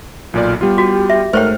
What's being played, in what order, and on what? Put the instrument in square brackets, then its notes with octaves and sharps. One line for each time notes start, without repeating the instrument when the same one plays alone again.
[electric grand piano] B1 A#2 D5 [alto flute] F4
[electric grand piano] G3 B3 F4 [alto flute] G4
[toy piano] F#4
E5
[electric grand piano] G#2 A3 F6 [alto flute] A#4 [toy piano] C5 C#5 G5